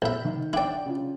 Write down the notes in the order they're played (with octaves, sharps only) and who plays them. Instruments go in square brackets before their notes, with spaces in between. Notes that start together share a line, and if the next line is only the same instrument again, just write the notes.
[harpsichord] A1 E5 [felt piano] B5 G6
[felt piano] D#3
[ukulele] D4 G5 [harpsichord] E4 D5 [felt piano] F#5
[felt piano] C#3 F4